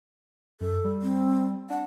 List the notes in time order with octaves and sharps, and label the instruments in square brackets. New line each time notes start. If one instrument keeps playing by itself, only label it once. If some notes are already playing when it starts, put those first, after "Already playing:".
[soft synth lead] F#2 [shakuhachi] A4
[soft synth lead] G3
[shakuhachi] C4
[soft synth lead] D4 [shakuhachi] F#5